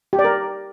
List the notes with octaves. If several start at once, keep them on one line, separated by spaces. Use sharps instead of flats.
G4
D5
A#4